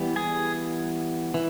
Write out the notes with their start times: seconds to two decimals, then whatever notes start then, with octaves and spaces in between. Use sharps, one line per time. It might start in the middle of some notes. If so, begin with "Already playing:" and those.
Already playing: E3 G3 B3
0.16 G#4 G#5
1.34 E3